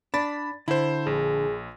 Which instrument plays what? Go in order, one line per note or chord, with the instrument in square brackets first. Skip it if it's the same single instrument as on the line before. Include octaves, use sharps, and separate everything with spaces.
[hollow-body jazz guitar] D4 [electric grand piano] B5 A6
[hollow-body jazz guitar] D3 [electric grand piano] E4 C5
[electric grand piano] A#1 [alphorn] G#4